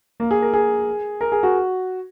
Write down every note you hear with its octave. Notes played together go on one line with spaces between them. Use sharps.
A#3
G#4
A#4
G#4
A#4
G#4
F#4